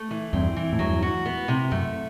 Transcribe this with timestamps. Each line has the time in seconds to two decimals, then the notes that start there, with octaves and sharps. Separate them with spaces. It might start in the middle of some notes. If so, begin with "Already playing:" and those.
Already playing: A3
0.11 E3
0.33 E2 G2 C4
0.56 E3
0.73 A2
0.79 E2 G2 F#3
1.03 F#4
1.26 B3
1.48 C3
1.71 F#2 A3